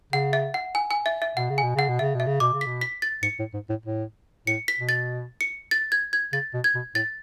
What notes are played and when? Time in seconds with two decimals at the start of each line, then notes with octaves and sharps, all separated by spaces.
0.13 C#3 F#5
0.33 E5
0.54 F#5
0.75 G#5
0.91 G#5
1.06 E5
1.22 E5
1.37 B2 F#5
1.50 C#3
1.58 G#5
1.63 B2
1.75 C#3 F#5
1.88 B2
1.99 C#3 E5
2.14 B2
2.20 E5
2.27 C#3
2.40 B2 D6
2.53 C#3
2.61 B6
2.66 B2
2.81 B6
3.02 A6
3.23 G#2 C#7
3.39 A2
3.54 G#2
3.70 A2
3.85 A2
4.47 A2 C#7
4.68 B6
4.79 B2
4.89 A6
5.41 C#7
5.71 A6
5.92 G#6
6.13 G#6
6.33 C#3 A6
6.54 B2
6.64 G#6
6.75 B2
6.95 A2 A6